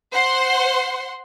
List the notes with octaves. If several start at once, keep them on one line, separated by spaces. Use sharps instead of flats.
C5 F#5 C6